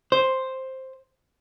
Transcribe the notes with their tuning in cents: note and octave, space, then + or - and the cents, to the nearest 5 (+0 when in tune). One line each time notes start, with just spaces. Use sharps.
C5 +5